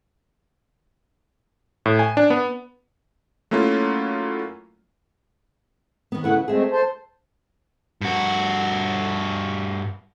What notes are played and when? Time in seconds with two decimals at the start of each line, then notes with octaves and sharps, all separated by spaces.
1.86 A2
1.99 G#5
2.17 D4
2.30 B3
3.51 F#3 A3 A#3 C#4 E4 F4
6.12 D#3 B3
6.24 C#3 A3 E4 B4 F#5
6.36 E2
6.48 G#3 A3 C4 G#4 E5
6.71 A4 C5
8.01 G2 F#4